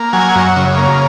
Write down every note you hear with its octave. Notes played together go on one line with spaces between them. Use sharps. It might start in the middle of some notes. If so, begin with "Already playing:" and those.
Already playing: A#3
F#3 G#5
F#2
C#3
A#3